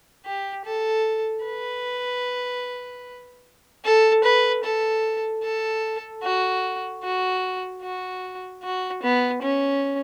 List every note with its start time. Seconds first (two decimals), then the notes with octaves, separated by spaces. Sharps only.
0.25 G4
0.65 A4
1.45 B4
3.84 A4
4.24 B4
4.64 A4
5.43 A4
6.23 F#4
7.03 F#4
7.83 F#4
8.63 F#4
9.03 B3
9.42 C#4